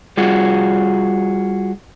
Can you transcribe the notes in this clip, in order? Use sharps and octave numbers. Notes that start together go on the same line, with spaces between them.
G3 F4 F#4 G#4